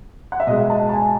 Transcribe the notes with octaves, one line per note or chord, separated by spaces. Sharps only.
F#5
E5
B2 G#3 D#5
A5
A5
G#5